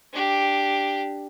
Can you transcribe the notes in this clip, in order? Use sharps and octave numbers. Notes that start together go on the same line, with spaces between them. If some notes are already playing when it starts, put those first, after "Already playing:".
D4 G4